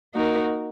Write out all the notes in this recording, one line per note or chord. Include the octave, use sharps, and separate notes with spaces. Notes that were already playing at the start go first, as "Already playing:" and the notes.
A#3 D#4 F#4 A#4